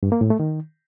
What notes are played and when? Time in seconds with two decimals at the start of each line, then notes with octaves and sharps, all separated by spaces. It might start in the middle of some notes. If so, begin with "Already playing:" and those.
0.03 G2
0.12 A#3
0.21 A2
0.30 A3
0.40 D#3